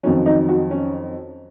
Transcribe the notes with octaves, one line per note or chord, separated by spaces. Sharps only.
F2 D#3 F#3 C#4
D#4
F#4
C#4